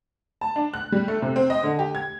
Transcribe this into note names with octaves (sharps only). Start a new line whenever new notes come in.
A5
D4
F#6
G3
A3
C3
C4
D#5
D3
G4
G#6